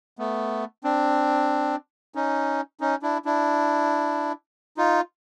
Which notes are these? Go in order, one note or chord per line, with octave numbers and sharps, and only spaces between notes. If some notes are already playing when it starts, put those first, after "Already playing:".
A3 B3
C4 D4
C#4 D#4
C#4 D#4
D4 E4
D4 E4
D#4 F4